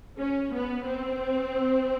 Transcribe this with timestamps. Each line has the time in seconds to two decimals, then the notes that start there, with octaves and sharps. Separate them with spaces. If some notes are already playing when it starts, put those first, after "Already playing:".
0.18 C#4
0.52 B3
0.86 C4